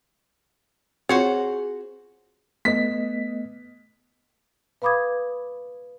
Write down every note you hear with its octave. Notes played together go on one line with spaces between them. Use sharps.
C4 F4 F#4 G#4 C5 C#5
A3 B3 D#5 B6
B4 F5 B5 D6 D#6 G#6